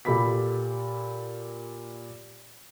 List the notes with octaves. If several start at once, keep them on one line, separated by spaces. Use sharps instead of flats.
A#2 G4 A4 B5 B6